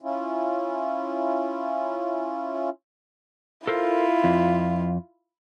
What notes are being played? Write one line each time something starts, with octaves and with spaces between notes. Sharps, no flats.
C#4 E4 F4
E4 F4 A4 A#4 C5
F2